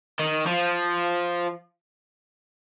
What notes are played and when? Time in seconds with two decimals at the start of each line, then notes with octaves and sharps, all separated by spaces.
0.19 D#3
0.46 F3